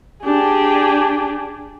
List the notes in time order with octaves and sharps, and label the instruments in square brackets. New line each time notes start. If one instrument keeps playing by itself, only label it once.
[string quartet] D4 G4 G#4